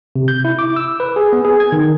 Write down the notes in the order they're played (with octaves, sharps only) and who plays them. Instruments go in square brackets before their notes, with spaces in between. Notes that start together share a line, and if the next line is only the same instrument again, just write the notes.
[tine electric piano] C3
G6
E4
D6
E6
B4
G#4
B3
G#4
G#6
D#3